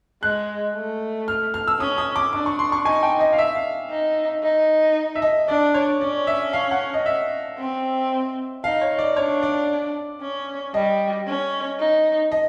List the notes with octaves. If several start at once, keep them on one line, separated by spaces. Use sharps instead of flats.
G#3 F#6
A3
F6
F6
E6
C#4 D#6
D#6
D6
D4 D6
C#6
C6
C#6
D#4 G#5
G5
D#5
F5
E5
F5
D#4
D#4
E5
D#5
D4 D5
C#5
C#4 D5
E5
F5
F#5
D#5
E5
C4
D#4 F5
C#5
D5
D4 C#5
D5
C#4
G3 D#5
C#4
D#4
D#5